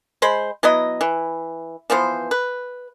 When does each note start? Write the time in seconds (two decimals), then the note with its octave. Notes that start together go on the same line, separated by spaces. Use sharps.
0.22 G#3 C5 B5
0.63 F#3 B3 E4 D#5
1.01 E3
1.90 E3 F3 B3 C5
2.31 B4